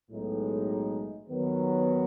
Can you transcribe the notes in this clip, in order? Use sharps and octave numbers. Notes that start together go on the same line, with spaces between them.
B1 A2 G#3 D#4
D#2 D#3 F#3 B3